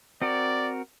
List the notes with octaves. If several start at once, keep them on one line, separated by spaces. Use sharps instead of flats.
C4 F#4 A#4 D5